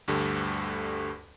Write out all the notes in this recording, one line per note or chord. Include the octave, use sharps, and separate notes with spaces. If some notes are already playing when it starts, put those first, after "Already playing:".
D2 G2 D3 G3 A4